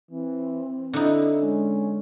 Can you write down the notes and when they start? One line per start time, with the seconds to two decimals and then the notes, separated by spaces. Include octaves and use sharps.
0.11 E3 C4
0.93 D3 D#4 E4
1.41 G#3 C#4